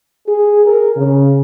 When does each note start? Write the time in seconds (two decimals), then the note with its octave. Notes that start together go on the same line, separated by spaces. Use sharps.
0.28 G#4
0.65 A#4
0.96 C#3